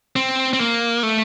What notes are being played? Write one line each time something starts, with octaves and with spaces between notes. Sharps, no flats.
C4
C4
A#3
A3